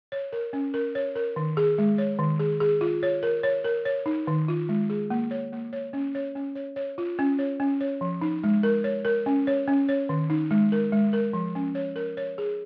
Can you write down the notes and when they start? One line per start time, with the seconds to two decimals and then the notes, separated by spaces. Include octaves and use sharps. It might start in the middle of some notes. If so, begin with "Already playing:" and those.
0.12 C#5
0.33 A#4
0.53 C#4
0.74 A#4
0.95 C#5
1.15 A#4
1.36 D#3
1.57 G#4
1.78 G#3
1.98 C#5
2.19 D#3
2.39 G#4
2.60 G#4
2.81 F4
3.03 C#5
3.23 A#4
3.43 C#5
3.65 A#4
3.85 C#5
4.06 D#4
4.27 D#3
4.48 F4
4.69 G#3
4.90 G#4
5.10 A#3
5.31 C#5
5.52 A#3
5.73 C#5
5.93 C#4
6.15 C#5
6.35 C#4
6.55 C#5
6.76 C#5
6.98 F4
7.19 C#4
7.39 C#5
7.60 C#4
7.81 C#5
8.01 F3
8.22 D#4
8.43 G#3
8.63 A#4
8.84 C#5
9.05 A#4
9.26 C#4
9.47 C#5
9.68 C#4
9.89 C#5
10.09 D#3
10.30 D#4
10.51 G#3
10.72 A#4
10.92 G#3
11.13 A#4
11.33 F3
11.55 C#4
11.75 C#5
11.96 A#4
12.17 C#5
12.38 G#4